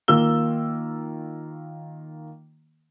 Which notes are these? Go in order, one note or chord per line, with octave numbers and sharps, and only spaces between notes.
D#3 A#3 F4 E6 G7